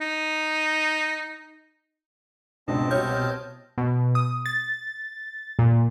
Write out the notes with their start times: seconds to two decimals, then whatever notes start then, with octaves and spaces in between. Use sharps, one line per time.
0.01 D#4
2.68 C#2 G#2 B2 C4 D4 D#5 A5
2.91 C2 F#4 C#5 F6 G6
3.78 B2
4.15 D#6
4.46 A6
5.59 A#2